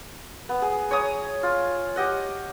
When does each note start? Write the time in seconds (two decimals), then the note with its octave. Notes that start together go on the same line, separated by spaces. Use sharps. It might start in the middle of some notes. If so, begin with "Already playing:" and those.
0.49 B3
0.62 G#4
0.91 C#5 A#5 D#6
1.43 F4
1.96 G4 D#5 F#5